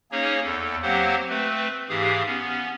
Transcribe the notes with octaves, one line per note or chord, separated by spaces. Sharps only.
A#3 C#4 D#4 G#4 C#5
E2 A4
F#3 A#3 C4 G4 C5 F#5
A3 C4 B4
G#2 E3 G4 G#4 F5
B3 C#4